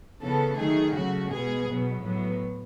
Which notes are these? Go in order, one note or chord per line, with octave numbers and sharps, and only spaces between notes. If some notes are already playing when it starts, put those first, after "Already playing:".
C#3 E3 B3 A4
D#3 F#3 A3 G#4
C#3 F#3 A3 F#4
B2 G#3 B3 G#4
B2 F#3 B3
A2 F#3 B3